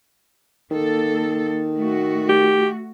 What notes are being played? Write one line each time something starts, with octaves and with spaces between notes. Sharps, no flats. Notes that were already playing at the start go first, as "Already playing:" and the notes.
D#3 A#3 A4
A3 F#4
G4